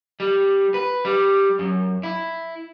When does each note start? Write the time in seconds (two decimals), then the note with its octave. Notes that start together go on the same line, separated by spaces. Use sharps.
0.20 G3
0.74 B4
1.05 G3
1.59 F#2
2.03 E4